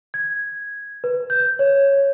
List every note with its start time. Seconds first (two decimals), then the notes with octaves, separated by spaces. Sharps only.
0.14 G#6
1.04 B4
1.30 G6
1.59 C#5